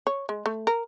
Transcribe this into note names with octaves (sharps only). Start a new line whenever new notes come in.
C#5
G#3
A3
A#4